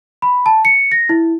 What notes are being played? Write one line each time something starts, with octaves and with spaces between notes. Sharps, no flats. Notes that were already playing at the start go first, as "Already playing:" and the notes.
B5
A5
C#7
A#6
E4